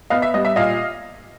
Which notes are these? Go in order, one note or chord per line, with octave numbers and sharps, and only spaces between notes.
B3 D#5 F5
E5
G3 D#5
E5
A#2 D#5 F5